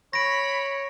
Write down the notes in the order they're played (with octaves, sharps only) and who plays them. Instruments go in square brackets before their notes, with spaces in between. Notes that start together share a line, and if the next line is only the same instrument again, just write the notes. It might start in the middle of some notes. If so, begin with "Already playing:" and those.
[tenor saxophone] C#5 [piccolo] B5 [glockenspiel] A#6 D7